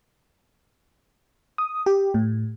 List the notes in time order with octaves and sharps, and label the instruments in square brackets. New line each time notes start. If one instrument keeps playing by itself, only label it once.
[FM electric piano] D#6
G4
A2